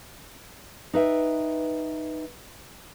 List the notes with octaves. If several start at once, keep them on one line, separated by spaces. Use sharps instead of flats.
D#4 B4 E5 G5